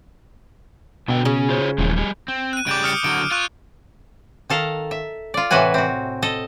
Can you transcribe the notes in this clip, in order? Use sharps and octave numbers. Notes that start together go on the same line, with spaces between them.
B2 D3 B3 G5
C#3 C#4
F4 C5 C#5
D#1 E3 F3 G#3
G3 G#4
C4
F#6 D#7
C#3 G3 D6 G6 D7
D#6 F6 C#7
D3 F#3 D7
F4 C#6 F#6
D#3 A4 F5 A5 A#5
E5
F4 D5
A2 C3 E3 F#4 B4 G#5
C4 F#4
A4 D#5